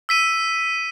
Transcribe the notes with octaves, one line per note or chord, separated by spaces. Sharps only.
E6 B6 D#7